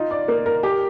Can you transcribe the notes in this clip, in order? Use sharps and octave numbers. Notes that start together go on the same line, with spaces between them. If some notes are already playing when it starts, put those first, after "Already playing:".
Already playing: D#4 F4
D5
A#3
A#4
G4